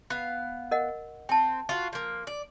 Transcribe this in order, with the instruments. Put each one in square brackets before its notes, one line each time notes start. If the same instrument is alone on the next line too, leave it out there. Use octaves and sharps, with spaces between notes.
[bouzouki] B3 F5
[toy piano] A#4 D#5 F#5
[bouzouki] C4 [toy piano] G5 A5
[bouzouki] F4 F#4
F3 A#3
D5